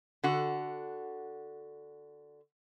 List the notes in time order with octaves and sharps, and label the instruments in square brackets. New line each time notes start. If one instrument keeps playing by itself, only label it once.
[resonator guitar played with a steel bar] D3 F#4